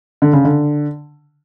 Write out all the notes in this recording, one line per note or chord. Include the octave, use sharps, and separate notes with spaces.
D3
C#3
D3